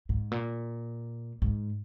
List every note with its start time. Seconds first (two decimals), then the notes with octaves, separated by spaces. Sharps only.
0.09 G#2
0.31 A#2
1.42 G#2